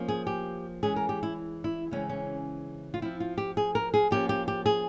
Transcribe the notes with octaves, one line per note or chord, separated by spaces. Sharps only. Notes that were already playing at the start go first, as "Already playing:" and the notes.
Already playing: F3 A#3 C#4
G#4
G4
E3 G#3 C#4 G#4
A#4
G4
E4
E4
C#3 E3 G#3 C4 C#4
C#4
F4
F3 C4 E4
F4
G4
G#4
A#4
G#4
F3 A#3 C#4 G4
G4
G4
G#4